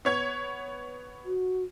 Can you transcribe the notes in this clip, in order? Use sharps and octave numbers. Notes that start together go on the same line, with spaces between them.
B3 C#5 G#6
F#4